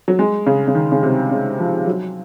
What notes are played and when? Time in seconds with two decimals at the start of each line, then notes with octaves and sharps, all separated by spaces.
0.08 F#3
0.19 G#3
0.47 C#3
0.68 C#3
0.75 D#3
0.92 C#3
1.03 C3
1.31 C#3
1.59 F3
1.87 F#3